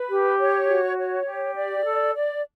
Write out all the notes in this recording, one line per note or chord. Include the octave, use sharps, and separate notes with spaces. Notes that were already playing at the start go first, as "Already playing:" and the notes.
Already playing: B4
G4
C#5
F#4
C#5
G4
D5
A4
D5